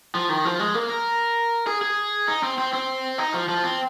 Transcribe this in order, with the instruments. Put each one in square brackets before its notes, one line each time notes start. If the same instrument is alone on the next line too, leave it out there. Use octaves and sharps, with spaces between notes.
[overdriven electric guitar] F3
D#3
F3
G#3
A#3
A#4
G#4
G#4
D#4
C4
C4
C4
D#4
F3
F3
C4